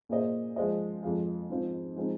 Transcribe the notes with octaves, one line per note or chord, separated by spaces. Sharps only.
A#2 A#3 G#4 C5 D#5
F3 G#3 F4 C5 D#5
F2 F3 G#3 F4
G#2 F3 C4 F4
F3 G#3 C4 D#4